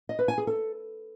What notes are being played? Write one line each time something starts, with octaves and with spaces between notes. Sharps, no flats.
D#5
B4
G#5
G#4
A4